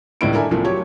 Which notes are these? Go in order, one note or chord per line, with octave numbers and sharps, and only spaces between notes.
C#2 A2 E3 G3 E4 D7
D4 A4 A#4 E5 G#5
C2 F3 A3 A#3
F#3 G4 C#5